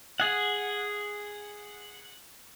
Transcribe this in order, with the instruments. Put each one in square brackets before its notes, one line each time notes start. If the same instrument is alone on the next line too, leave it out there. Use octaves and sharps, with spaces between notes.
[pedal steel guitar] G#4 F#5